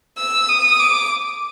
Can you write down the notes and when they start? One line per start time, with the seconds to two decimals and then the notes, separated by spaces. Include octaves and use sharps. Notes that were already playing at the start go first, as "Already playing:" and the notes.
0.18 E6
0.49 D#6
0.80 D6